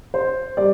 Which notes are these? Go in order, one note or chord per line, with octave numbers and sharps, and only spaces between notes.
C5
G3 D5